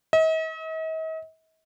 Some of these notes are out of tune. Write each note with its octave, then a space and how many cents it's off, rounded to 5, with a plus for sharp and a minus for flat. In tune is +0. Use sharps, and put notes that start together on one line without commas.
D#5 +45